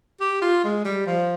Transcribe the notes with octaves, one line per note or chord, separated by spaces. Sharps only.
G4
F4
G#3
G3
F3